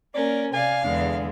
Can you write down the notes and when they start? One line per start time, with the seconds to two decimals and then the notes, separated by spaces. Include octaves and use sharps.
0.14 A#3 C#4 A#4 D5
0.54 C3 D5 F5 G#5
0.84 E2 D3 G#3 D4